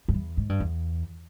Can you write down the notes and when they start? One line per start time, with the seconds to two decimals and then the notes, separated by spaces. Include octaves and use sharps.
0.08 G2
0.14 E2
0.37 G#2
0.49 G2
0.60 E2